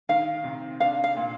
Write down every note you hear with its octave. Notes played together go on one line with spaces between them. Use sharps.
D#3 F5
C3
D4 F5
F5
A#2